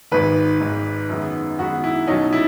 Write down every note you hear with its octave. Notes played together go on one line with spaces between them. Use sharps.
G#1 G#2 D#3 B4
G#1 G#2 D#3
F#2 D#3 G#3 B3
F#2 D#3 G#3 B3 F#4
E4
B1 B2 F#3 C#4 D#4
E4